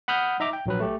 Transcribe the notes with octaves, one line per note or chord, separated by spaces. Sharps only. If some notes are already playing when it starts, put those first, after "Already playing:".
F#5 B5 D#6 F6 G6
D#4 E5 A#5 D6
G5
A#1 F#3 B4
A3 G4